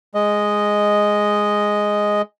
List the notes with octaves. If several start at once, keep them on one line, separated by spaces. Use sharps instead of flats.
G#3 D#5